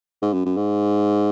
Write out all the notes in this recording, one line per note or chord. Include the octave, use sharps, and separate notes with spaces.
G#2
F#2
F#2
G#2